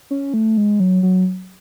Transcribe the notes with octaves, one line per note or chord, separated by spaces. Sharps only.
C#4
A3
G#3
F#3
F#3